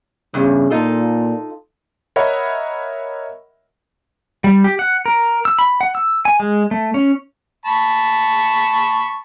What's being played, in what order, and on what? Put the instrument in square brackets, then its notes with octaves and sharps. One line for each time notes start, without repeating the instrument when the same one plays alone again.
[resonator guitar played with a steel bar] E2 G2 [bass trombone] C#3
[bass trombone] A#2 [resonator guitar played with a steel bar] D#4 F4 A4
[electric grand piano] A#4 C#5 D#5 E5 F#5 B5
[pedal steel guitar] G3
G4
F#5
A#4
E6
B5
F#5
E6
G#5
G#3
A3
C#4
[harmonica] A5 B5 C#6